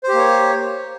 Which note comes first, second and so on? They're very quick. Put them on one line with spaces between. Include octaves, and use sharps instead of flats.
C5 G4 A#3 C#5